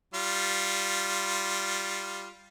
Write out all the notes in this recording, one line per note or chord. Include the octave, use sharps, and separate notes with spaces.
G3 F4